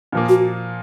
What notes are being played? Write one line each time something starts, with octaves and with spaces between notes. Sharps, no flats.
A#2 F3 A#3
F#4